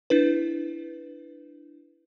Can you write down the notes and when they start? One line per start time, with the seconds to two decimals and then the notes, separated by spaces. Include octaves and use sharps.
0.10 D4 E4 B4